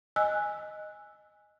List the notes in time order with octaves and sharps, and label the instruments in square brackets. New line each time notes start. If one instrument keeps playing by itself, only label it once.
[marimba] D#5 G#5 E6 F#6